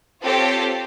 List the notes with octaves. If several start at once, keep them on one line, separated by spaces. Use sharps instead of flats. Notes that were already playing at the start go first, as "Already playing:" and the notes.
C4 F4 G4 A4 C5 C#5